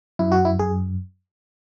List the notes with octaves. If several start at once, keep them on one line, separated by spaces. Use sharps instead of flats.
F#2 E4
F#4
E4
F#2 G#4